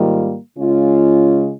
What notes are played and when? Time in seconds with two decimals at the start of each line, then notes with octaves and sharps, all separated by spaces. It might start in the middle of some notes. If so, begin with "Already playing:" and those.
Already playing: G#2 D#3 G3 A#3 F4
0.58 C#3 G#3 C#4 F4